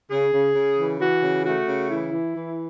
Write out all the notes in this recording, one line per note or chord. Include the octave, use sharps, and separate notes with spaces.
C#3 G#4
C#3
C#3
E3
E3 F#4
C#3
A3 F#4
C#3
E3 E4
E3
E3